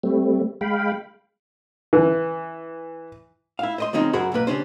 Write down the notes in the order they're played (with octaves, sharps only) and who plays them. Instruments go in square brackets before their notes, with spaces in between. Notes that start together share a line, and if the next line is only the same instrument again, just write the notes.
[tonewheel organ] G3 A3 C4
G#3 F5 G5 B5
[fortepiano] E3
[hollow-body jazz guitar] E4 F5
C5 D#5 C6
C#3 F3 G#3 C4 D#4
F#2 F#4 G#4 A#4 C5 B5
B1 G#2 A#3 B4
C#3 E3 G3 C#4 D4 C5